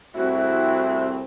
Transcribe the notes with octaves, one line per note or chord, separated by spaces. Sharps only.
C2 A2 C4 E4 F#4